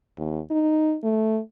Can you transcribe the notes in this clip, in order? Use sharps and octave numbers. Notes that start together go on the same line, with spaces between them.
D#2
D#4
A3